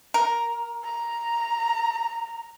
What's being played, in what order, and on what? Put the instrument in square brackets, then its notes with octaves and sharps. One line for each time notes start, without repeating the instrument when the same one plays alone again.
[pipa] A#4
[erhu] A#5